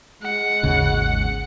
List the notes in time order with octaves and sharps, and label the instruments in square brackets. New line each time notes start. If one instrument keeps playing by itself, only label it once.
[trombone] G#3 [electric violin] F#5
[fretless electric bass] G#1 D#2 C#3